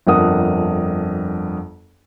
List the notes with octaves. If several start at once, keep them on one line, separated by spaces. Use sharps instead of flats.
G1 F2 D4 A#4 F#5 D#6